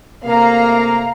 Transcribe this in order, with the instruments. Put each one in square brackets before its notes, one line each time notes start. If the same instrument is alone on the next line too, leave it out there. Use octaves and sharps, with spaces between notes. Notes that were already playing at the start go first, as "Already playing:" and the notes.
[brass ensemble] C3 A3 A#3 [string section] F5 A#5